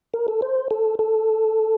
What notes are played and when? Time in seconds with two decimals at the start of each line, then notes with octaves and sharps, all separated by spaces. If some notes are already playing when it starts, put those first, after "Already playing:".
0.14 A#4
0.28 A4
0.42 C5
0.71 A4
0.99 A4